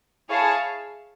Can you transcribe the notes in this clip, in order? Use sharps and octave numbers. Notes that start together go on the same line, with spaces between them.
E4 G#4 C#5 F5 A5